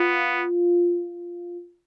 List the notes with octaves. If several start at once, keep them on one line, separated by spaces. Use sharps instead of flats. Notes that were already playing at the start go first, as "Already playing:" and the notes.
Already playing: B3 F4